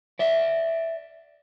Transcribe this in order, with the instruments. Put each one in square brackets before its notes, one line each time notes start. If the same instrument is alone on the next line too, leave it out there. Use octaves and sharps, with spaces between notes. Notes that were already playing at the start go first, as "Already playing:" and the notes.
[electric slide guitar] D5 E5